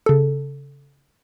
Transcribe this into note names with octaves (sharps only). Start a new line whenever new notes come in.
C#3 A4